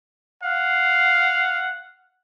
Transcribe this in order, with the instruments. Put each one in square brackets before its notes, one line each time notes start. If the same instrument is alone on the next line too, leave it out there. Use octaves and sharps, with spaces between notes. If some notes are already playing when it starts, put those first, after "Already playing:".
[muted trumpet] F5 [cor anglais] F#5